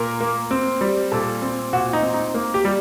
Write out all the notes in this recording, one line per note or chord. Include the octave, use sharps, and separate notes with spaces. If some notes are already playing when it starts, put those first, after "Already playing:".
Already playing: A#2 A#4
A#3
C4
G3
A#2 A4
C4
A#2 F#4
D#4
C4
D#4
A#3
G4
G3